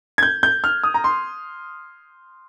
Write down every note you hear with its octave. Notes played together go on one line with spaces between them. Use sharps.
G#6
G6
G6
F6
D#6
A#5
C6